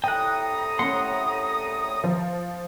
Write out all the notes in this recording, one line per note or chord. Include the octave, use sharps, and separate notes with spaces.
C2 A2 G5 A#5 D#6 F#6
A3 C#4 F#5 C6
F3